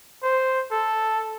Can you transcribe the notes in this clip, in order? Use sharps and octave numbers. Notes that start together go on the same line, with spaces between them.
C5
A4